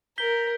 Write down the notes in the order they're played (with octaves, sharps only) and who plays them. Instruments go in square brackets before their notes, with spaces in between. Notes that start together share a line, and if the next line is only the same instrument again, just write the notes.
[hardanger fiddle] A#4 [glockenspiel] G6 B6 G7